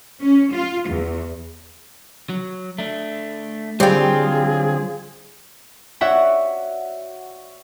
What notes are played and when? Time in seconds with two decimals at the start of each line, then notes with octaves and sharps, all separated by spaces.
0.20 C#4
0.52 F4
0.89 E2
2.30 F#3
2.78 A3 D4
3.80 D3 F#3 G3 C4 F4 G#4 D5 G5
6.01 F#4 C#5 D5 E5 F#5 G5